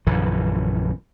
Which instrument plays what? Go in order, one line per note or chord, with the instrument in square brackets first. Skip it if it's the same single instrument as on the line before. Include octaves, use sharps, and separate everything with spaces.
[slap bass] A#1 F#2 D3 E3